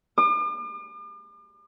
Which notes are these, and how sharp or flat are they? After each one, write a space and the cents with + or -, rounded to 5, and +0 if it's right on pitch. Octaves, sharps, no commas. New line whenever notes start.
D6 +45